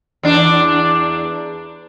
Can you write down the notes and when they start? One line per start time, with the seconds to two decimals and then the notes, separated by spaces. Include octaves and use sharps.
0.23 E2 D4